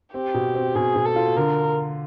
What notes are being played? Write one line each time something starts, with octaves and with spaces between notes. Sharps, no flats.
C4 G4
B2
C4
B2 G#4
B2
A4
F4
D3 A#4